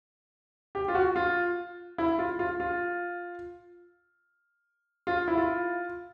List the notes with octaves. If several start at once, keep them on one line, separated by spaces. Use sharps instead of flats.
G4
F4
F#4
F4
E4
F4
F4
F4
F4
E4
F4